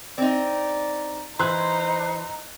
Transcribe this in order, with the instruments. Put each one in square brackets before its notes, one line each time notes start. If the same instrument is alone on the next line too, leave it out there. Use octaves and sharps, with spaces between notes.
[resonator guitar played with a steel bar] C4 D#4 [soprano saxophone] D5
[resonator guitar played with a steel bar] E3 [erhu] D#4 [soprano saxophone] C5 [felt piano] C6 F#6